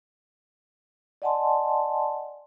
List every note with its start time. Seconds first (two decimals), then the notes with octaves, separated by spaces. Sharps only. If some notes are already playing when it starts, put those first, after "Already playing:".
1.22 D5 D#5 F#5 G#5 A5 C6